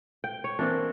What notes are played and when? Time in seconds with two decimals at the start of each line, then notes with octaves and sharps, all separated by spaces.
0.24 G5
0.44 C#5
0.59 E3 A#3 C4 D4